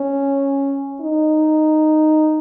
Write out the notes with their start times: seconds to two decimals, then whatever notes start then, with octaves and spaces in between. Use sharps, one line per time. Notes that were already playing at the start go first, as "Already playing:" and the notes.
Already playing: C#4
1.01 D#4